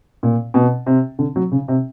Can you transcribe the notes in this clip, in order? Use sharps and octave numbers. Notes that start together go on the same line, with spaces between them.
A#2
B2
C3
D3
F#3
C#3
C3